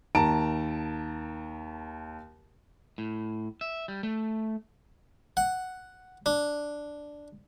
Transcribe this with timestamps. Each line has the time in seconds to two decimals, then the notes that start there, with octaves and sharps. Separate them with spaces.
0.15 D#2 A5 A#5 D7
2.98 A2
3.61 E5
3.88 G3
4.03 A3
5.37 F#5
6.26 D4